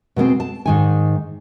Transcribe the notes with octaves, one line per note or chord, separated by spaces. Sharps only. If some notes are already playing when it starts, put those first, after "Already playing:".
B2 G#3 A#3 C4
A5
G#2 D#3 G#5